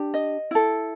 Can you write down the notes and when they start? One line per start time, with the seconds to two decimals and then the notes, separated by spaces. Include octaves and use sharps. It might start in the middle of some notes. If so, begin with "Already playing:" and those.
Already playing: D4 G4
0.14 D#5
0.51 E4 A4